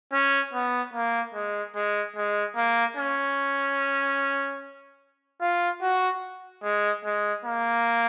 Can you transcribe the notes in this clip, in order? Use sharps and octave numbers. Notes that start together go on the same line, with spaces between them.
C#4
B3
A#3
G#3
G#3
G#3
A#3
C#4
F4
F#4
G#3
G#3
A#3